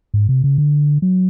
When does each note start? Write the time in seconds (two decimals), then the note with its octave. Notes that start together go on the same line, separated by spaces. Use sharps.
0.14 G#2
0.29 C3
0.44 C#3
0.58 D3
1.02 F#3